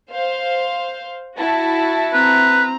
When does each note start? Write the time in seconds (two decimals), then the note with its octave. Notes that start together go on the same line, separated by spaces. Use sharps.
0.11 C5 F5
1.37 E4 F#4 A5
2.13 C4 B4 A#5